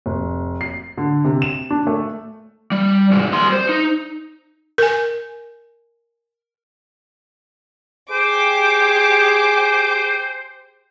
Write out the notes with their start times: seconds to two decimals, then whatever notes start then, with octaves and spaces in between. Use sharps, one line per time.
0.06 F1
0.61 C7
0.98 D3
1.25 C3
1.42 E7
1.71 D4
1.87 A3
2.72 G3
3.11 D#2 G#2
3.32 G3 C6
3.52 C5
3.69 D#4
4.78 A#4 G#5
8.11 G4 G#4 C5 D6